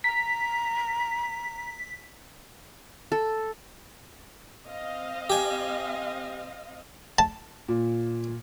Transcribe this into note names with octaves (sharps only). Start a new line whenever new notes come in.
A#5 B6
A4
C4 D#5 F5
G4 G#5
A5
A#2